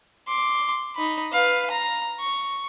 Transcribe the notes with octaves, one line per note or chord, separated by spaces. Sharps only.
C6 D6
D#4 B5
B4 F5
A#5
C#6